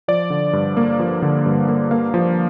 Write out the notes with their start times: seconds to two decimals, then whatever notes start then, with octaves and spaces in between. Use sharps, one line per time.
0.08 F3 D5
0.30 D3
0.53 G2
0.77 A#3
0.99 F3
1.22 D3
1.46 G2
1.68 A#3
1.91 A#3 F5
2.14 F3